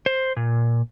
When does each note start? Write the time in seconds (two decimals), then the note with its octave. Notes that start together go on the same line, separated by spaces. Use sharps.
0.06 C5
0.37 A#2